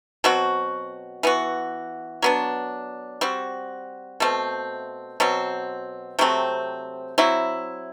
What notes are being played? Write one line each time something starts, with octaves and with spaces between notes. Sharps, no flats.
B2 F#3 C4 F#4
E3 B3 F#4
F#3 B3 D4
G3 C4 F#4
B2 A3 C4
B2 F#3 C4
C3 F#3 A3 C4
F#3 C4 E4